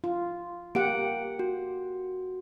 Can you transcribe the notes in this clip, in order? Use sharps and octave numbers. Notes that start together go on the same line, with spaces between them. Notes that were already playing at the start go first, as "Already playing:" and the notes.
F4
A#3 G4 F#5 D7
F#4